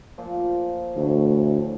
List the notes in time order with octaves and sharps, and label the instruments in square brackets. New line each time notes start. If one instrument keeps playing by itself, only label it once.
[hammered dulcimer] A#2 F3
[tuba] D2 [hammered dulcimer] A2 A3